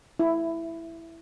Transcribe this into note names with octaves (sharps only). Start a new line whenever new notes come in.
E4